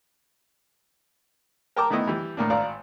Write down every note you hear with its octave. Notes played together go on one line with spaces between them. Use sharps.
A#4 G5 A5 A#5 D6
D#3 A3 B3 E4 D#5
E3 G3
A2 A#3 D4
G#1 D5 F5 A#5